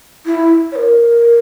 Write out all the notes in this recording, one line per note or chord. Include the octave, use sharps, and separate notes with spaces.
E4
C#5
A#4